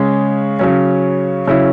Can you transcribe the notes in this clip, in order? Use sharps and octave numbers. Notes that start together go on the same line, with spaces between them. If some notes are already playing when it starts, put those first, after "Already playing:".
Already playing: C#3 G#3 C#4
C#3 F#3 C#4
C#3 F#3 C#4 E4